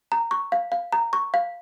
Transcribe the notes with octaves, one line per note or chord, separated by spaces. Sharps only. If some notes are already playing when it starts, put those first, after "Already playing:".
A#5
C#6
F5
F5
A#5
C#6
F5